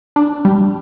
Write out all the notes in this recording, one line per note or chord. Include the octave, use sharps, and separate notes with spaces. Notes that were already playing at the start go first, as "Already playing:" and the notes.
D4
G3